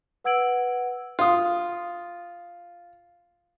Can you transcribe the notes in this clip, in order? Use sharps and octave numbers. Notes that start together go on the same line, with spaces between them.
B4 F#5 E6 G#6 D7 F#7
F4 D#6